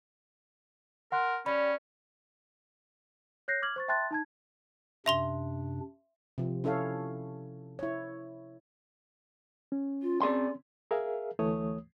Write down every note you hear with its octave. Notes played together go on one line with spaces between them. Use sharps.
A#4 F#5 C6 F#6
G3 C#4 B5
C#5 F#6 G6 A#6 C7
D6 F6 G#6 F#7
C5 C#6 A6
E5 G5 A5 C6 F#6 A6
D#4 A5 G#6
F#2 C3 D4 E5 C6 G7
C3 F3
C#4 E4 A4 C#5 F5
E4 C#5
C#4
F4
C4 G#4 D5 C6
G#4 A#4 E5 F5
D2 E3 A3 C#5 D#6